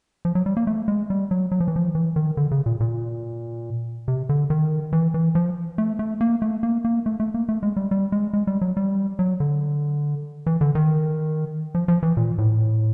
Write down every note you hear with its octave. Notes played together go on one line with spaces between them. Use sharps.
F3
F#3
G3
A#3
A3
G#3
G3
F#3
F#3
F3
E3
F3
E3
D#3
D3
C#3
A#2
A#2
C3
D3
D#3
E3
E3
F3
A3
A3
A#3
A3
A#3
A#3
A3
A3
A#3
A3
G#3
G3
G3
G#3
G#3
G3
F#3
G3
F#3
D3
E3
D3
D#3
F3
F3
E3
A#2
A2